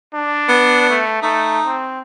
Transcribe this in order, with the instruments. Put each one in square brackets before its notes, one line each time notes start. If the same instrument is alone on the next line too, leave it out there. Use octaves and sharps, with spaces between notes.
[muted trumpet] D4
[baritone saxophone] B3
[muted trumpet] A3
[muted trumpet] A3 [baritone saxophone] D#4
[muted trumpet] C4